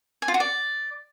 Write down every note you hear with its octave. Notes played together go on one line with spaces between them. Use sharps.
G#5
F4
F#4
D5